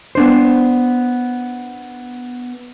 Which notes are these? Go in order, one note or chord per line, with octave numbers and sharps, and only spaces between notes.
B3 D4 C5